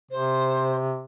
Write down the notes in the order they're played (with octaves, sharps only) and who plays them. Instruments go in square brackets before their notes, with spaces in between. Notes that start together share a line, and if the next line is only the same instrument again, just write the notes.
[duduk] C3 [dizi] C5